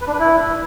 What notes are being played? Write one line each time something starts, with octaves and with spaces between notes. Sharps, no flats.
B4
D4
B4
E4